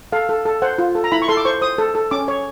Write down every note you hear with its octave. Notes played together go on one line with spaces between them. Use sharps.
A4 F5
A4
A4
C5 F#5
F4
A4
A#5
E4 B5
C#6
A4 C6
D6
C5 C#6
C5 D#6
A4
A4
C#4 D6
C#5